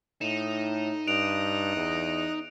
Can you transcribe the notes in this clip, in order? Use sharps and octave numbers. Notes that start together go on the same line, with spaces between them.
A2 D#4 E7
G2 D#5 D#6 F#6 D7 F7
E2